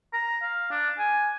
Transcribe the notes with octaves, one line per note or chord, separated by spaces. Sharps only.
A#5
F5
D4
G#5